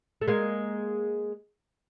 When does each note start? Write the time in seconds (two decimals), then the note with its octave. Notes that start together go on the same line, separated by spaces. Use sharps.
0.21 A3
0.28 G#3 A#3